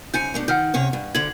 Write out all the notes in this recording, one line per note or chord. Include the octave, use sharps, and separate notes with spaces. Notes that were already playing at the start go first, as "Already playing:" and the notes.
G#2 C#3 G#5 G6 C#7
B2 A3 D4
D#3 F#5 F6 G6
C3 C#4 C#5
G2
D2 D3 G#6 F#7